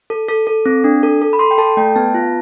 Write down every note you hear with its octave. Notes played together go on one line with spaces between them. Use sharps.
A4
A4
A4
C4
D4
A4
A4
B5
A4 C6
G5
A4 A5
A3 G5
B3 A5
F4